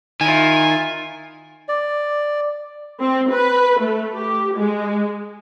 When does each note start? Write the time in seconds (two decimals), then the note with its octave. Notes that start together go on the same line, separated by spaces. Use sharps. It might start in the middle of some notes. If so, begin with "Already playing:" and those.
0.21 D#3 E4 F4 G#5
1.69 D5
3.00 C4
3.32 B4
3.81 A3
4.16 G4
4.57 G#3